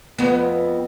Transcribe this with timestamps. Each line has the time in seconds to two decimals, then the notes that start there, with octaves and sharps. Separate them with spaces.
0.18 F2 B3